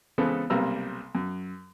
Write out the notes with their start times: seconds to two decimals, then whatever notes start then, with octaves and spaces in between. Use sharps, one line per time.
0.18 C#3 E3 G#3 B3 C4 A4
0.50 B1 C3 G3 A#3 A#5 E6
1.15 F#2